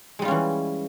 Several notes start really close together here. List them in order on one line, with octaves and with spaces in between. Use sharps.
G#3 G3 F4 C#4 E3